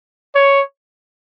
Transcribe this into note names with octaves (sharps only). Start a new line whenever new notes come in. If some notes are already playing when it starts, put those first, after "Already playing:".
C#5